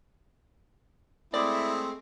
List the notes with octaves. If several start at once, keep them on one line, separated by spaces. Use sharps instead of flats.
G#3 A3 C4 E4 D5 D#6